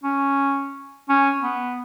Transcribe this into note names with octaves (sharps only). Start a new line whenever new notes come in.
C#4
C#4
B3